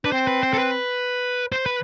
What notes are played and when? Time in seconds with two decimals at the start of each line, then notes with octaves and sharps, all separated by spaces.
0.05 D4 B4
0.12 C4 C5
0.27 B4
0.43 C5
0.53 A4
0.59 B4
1.52 C5
1.66 B4